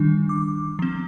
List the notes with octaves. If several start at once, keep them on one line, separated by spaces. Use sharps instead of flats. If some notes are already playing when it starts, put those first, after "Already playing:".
Already playing: D#3 G3 D4
D6
F3 C4